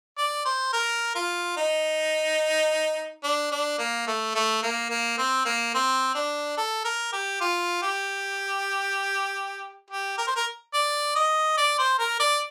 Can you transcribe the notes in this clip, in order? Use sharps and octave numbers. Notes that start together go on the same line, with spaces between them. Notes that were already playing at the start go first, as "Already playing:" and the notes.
D5
C5
A#4
F4
D#4
D4
D4
A#3
A3
A3
A#3
A#3
C4
A#3
C4
D4
A4
A#4
G4
F4
G4
G4
A#4
C5
A#4
D5
D#5
D5
C5
A#4
D5